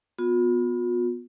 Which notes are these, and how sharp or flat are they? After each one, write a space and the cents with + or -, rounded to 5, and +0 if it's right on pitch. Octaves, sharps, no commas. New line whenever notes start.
B3 +0 F4 +45